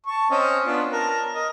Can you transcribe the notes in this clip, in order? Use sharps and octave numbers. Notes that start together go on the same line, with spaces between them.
A5 C#6
C4 C#4 D#5
B3 D4 F4
A#4 A5
A#4 D#5